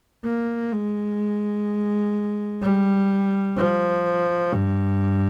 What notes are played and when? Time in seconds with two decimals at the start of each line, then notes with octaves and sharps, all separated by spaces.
0.24 A#3
0.72 G#3
2.62 G3
3.57 F3
4.52 G2